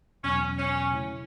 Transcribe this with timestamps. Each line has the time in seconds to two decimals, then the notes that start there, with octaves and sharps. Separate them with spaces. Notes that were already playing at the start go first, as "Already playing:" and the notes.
0.24 E2 B2 F#3 C#4
0.58 C#4
0.93 C#3 A3 E4